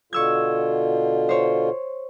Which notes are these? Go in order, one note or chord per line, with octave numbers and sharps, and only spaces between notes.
B2 D3 F4 C#6 E6 G#6
C5 C#5